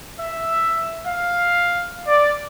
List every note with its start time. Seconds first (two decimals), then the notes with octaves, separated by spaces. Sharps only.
0.19 E5
1.05 F5
2.07 D5